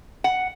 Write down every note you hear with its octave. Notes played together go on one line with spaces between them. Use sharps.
F#5